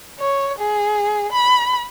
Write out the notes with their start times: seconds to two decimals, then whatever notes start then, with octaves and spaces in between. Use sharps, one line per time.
0.20 C#5
0.58 G#4
1.32 B5